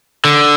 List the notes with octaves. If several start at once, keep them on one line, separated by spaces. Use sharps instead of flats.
D3